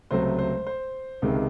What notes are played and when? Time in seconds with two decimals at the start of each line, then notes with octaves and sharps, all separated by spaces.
0.11 C#2 C3 F#3 A3 C5
0.39 C5
0.67 C5
1.22 C#2 C3 D#3 G#3